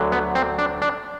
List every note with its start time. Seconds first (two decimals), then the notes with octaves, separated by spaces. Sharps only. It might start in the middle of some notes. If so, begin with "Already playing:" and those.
Already playing: D2 D3 F#3
0.12 B3
0.35 C4
0.58 D4
0.82 D4